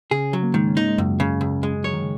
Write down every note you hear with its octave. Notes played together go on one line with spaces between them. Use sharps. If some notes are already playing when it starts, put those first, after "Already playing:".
C#3 C#4 G#4
F#3 C#4
A#3
G#2 D#3 G#3
C#4
A#3 D#4
G#3
C#2 F#2 F#3
C#3
C#2
G#3
F#3 C#5
D#3
C#3